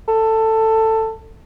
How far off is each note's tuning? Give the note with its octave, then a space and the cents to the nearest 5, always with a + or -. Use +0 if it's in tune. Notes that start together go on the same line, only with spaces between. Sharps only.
A4 +15